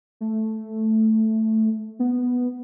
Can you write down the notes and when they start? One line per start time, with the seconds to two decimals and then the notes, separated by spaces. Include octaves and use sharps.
0.21 A3
1.99 B3